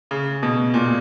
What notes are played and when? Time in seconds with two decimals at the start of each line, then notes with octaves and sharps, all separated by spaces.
0.11 C#3
0.43 B2
0.74 A#2